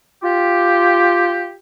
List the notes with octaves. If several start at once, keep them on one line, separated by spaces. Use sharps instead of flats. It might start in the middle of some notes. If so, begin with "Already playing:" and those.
F4 G4